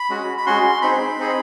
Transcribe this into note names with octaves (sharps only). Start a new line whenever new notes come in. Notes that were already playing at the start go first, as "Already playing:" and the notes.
Already playing: B5
G#3 C#4 F#4
B5
G#3 C#4 F#4 C6
C4 D#4 G#4 B5
C4 D#4 G#4